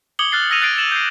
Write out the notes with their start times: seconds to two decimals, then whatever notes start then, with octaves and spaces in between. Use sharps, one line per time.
0.19 D6 D#6 G#6 C#7 F#7 G7
0.32 F6 F#6 A6 C7 G7
0.50 E6 A#6 C#7 D#7 F7
0.62 F#6 G#6 A6 C7 D7
0.77 A6 E7 F#7
0.92 G6 C7